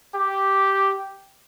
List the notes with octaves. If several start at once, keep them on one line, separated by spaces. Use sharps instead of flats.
G4